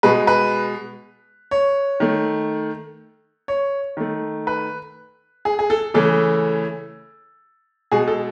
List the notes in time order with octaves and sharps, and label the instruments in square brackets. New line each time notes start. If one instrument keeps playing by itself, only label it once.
[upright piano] B2 G#3 B4
B4
C#5
D#3 A3
C#5
D#3 A3
B4
G#4
G#4
A4
C#3 E3 A3 A4
B2 G#3 G#4
A4